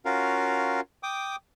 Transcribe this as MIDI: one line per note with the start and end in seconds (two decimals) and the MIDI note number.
0.05 0.81 61
0.05 0.81 65
0.05 0.81 66
0.05 0.81 70
0.05 0.81 77
1.03 1.36 79
1.03 1.36 86
1.03 1.36 87